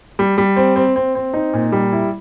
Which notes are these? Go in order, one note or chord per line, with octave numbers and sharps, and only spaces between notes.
G3
G3
C4
C4
C4
C4
D#4
A#2
G3
E4